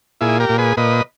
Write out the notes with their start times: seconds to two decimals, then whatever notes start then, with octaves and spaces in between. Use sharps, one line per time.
0.21 A#2 E4 G#4
0.40 G4 A#4
0.49 A#2
0.58 G#4 B4
0.77 A#2 B4 D#5